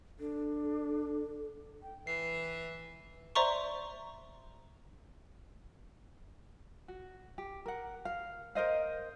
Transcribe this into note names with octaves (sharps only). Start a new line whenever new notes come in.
D4 A4
G5
E3 C7
C5 D5 E5 A#5 C6 C#6
F#4
G4
A#4 F#5
F5
A#4 C5 D#5 F5